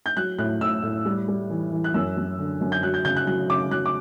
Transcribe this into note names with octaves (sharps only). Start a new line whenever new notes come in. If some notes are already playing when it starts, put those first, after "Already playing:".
G6
F#3 F#6
A2 F#6
A2 E6
A2
G3
G3
E3
E3
F#6
F#2 E6
F#2
D3
F#2
G6
F#3 F#6
G6
C#3 G6
F#6
F#3 F#6
C#3 D6
F#3 F#6
D6